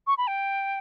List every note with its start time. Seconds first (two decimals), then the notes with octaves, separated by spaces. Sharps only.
0.07 C#6
0.18 B5
0.27 G5